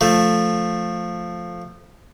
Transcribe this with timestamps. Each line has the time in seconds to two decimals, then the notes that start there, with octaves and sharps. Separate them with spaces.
0.01 F3 A3